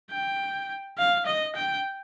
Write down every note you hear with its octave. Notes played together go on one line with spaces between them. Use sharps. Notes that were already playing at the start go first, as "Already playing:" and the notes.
G5
F5
D#5
G5